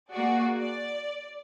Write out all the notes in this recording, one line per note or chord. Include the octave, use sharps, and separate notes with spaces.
A#3 F#4 G#4 D5
D5